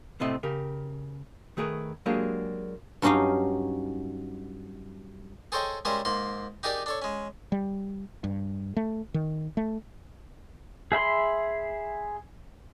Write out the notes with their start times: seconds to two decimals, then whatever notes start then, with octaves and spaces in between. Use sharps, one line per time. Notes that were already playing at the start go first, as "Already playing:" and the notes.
0.20 A2 C3 A3 C4 D#5
0.43 C#3 G4 A#4
1.57 D#3 A3 G#4 A#4 B4
2.06 F#3 G#3 A#3 D4 G4 G#4
3.02 G2 F#3 C#4 D#4 G4 F5
5.52 G#4 A4 C5 C#5 D#5 G5
5.85 G3 G#3 C#4 A#4 C5 E5
6.05 G#2 A#3 C6
6.63 D#4 G4 G#4 A#4 D5
6.86 D4 A4 C#5
7.02 G#3 C#4
7.52 G3
8.24 G2
8.77 A3
9.14 D#3
9.57 A3
10.92 G#4 E5 B5 C6